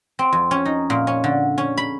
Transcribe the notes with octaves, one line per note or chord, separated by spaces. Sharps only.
C4
F2
C#4
D#4
A#2
C#4
D3
C#4
B5